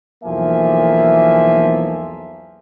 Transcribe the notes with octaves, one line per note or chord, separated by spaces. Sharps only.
B1 E2 F3 A#3 E5 G#5